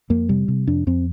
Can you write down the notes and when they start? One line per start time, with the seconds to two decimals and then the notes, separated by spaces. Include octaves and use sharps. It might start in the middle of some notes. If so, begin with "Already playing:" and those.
0.10 F2 A#3
0.29 C3 G3
0.48 C3
0.67 F2 D4
0.87 F2 C4